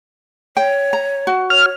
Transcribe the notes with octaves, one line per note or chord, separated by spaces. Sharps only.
C#5 G5
A#5
F#4
C#5 F6